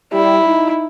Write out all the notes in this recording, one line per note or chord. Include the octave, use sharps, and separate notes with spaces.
G3 E4
D#4